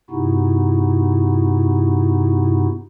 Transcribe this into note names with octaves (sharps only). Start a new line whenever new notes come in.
G2 C3 B3 D#4 E4 F#4